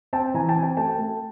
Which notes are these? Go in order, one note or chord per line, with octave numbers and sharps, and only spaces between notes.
C4 G5 A5
E3 G#5 A#5
G5 A5
C4 G#5
G5 A5
A3 G5 A5
A3